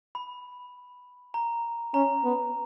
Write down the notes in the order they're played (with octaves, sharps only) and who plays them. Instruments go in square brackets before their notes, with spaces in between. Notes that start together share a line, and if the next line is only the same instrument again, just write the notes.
[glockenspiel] B5
A#5
[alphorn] C#4 [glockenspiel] A#5
[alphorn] B3